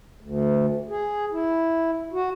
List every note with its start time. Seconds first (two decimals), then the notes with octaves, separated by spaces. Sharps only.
0.21 D2
0.89 G#4
1.32 E4
2.13 F#4